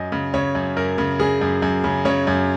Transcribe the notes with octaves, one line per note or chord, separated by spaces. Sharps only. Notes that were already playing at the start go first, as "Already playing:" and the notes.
Already playing: F#2 D#5
C#3
C#3 C#5
F#2
F#2 A#4
C#3
C#3 G#4
F#2
F#2
C#3
C#3 C#5
F#2